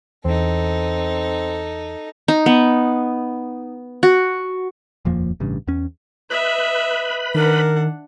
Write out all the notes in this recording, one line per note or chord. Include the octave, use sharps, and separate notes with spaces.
E2 C4 D#4 A4
D#4
B3
F#4
D#1 F2 F3 A#3
A1 G2 C#3
E2 C#4
B4 D#5 E5 B5
D#3 D4 A#4 F#5